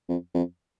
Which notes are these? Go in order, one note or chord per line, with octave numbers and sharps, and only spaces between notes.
F2
F2